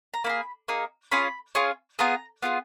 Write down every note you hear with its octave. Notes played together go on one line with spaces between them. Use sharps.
A#5
A#3 D#4 B5
G#4
A#3 D#4 G#4
C#4 F4 G#4 B5
C#4 F4 G#4
B3 F4 G#4 A#5
B3 F4 G#4